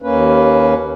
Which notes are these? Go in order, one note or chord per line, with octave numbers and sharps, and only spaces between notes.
D#2 A#3 C#4 B4